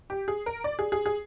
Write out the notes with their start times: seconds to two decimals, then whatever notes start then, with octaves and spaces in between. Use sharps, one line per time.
0.10 G4
0.28 G#4
0.46 A#4
0.64 D5
0.79 G#4
0.92 G#4
1.06 G#4